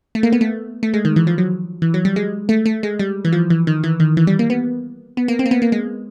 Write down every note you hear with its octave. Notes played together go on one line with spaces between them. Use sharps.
A3
A#3
B3
A3
A3
G#3
D#3
E3
F3
F#3
E3
F#3
G3
G#3
A3
A3
G#3
G3
E3
F3
E3
D#3
E3
D#3
E3
G3
A#3
B3
B3
A#3
C4
A#3
B3
A#3
G#3